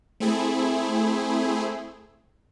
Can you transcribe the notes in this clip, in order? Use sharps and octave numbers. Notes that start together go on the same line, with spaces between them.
A3 C4 E4 G#4